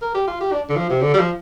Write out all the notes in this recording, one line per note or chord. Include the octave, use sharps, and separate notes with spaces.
A#4
G4
F4
G4
D4
D3
F3
C3
D3
G3
F3